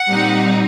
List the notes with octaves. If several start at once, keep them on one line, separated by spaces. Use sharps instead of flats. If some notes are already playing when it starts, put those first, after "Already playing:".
Already playing: F#5
A#2 G3 C4 D#4